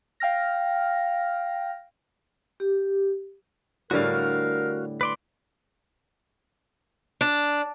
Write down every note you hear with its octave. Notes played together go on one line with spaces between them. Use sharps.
F5 G5 F6 A#6
G4
A2 D3 G3 F#4 A#4 F5
B4 D5 C6
D4